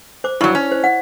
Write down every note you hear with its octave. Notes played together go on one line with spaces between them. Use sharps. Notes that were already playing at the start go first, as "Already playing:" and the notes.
C5 D6
G2 F#3 E4 C#6
C#4
C5
F#5